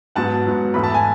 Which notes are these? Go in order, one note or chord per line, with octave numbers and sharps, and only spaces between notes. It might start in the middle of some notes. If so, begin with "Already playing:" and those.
G#2 F#3 B3 F#5 A5
G#2 F#3 B3
G#2 E3 A3 B5
A5
G#5